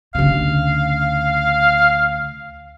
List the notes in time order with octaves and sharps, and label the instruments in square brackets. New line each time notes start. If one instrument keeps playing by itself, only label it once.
[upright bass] D2 C#3 [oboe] F5